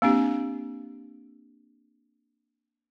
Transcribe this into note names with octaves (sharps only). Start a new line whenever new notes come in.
A#3 C4 D4 G4